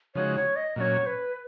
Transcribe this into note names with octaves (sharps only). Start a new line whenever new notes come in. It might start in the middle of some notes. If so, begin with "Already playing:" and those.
C#3 F3 G#3 D#4 F#4 C#5
C#5
D#5
A#2 F#3 C#4 C#5 D#5
B4